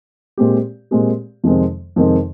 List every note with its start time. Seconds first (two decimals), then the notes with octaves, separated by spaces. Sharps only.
0.38 A#2 G#3 C4 G4
0.91 A#2 G#3 C4 G4
1.43 F2 C3 D#3 G#3 C4
1.96 F2 C3 D#3 G#3 C4